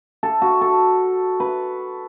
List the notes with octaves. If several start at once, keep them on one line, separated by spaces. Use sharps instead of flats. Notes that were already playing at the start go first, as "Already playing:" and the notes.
A4
F#4
A4
B4